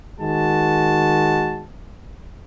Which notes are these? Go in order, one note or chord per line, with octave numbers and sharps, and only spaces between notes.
D#3 G#3 F#4 A5